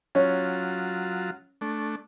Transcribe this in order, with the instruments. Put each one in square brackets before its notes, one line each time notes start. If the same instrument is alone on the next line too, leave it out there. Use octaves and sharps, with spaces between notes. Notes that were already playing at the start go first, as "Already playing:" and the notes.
[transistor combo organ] F#3 F4 [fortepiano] C#4
[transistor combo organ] A3 D4